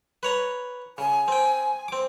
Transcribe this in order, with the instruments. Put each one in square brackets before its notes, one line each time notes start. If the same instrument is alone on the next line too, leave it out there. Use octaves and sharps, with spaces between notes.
[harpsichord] B4 C#5 A#5
[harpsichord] C#3 [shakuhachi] G#5
[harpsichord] C4 G5
C4 D6